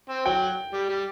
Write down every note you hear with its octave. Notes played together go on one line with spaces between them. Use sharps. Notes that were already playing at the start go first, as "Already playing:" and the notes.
C4
F#3 G5
G3
G3